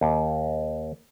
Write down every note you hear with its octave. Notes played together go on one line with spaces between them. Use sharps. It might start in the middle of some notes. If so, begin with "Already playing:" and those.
D#2